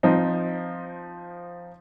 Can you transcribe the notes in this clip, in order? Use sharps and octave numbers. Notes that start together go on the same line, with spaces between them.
F3 C4 D#4